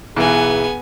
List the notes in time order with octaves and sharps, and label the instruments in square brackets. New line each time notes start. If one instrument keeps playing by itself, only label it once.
[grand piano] B1 E3 [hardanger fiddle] B3 G#5 [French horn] G#4